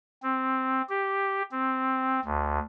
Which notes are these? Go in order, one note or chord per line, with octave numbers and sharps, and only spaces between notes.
C4
G4
C4
D2